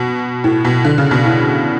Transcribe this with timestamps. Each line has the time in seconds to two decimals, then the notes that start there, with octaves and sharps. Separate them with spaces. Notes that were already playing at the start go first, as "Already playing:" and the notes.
Already playing: B2
0.44 A2
0.65 B2
0.85 D3
0.98 C#3
1.11 B2
1.25 A2